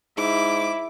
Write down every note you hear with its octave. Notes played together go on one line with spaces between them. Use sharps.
G#2 E4 D6